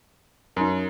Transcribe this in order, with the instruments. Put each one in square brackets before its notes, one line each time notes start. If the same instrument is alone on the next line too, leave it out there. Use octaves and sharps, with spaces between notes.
[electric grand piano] F#2 [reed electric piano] D#4 A#4